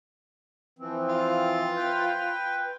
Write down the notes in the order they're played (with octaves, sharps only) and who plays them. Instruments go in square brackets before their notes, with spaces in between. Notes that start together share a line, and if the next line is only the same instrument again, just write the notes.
[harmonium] E3 F3 C4
[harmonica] F4
[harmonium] B4 G5